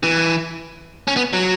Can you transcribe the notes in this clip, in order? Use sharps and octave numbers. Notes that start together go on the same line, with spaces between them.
E3
C#4
B3
F#3